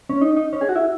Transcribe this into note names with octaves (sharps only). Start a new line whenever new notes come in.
C#4
D#4
D#4
C#4
G#4
F#4
E4